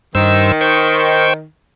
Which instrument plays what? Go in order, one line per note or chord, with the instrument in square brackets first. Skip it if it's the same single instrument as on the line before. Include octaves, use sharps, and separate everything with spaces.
[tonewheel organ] G2 C5 E6 [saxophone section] D#3
[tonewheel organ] C5 G5 C#6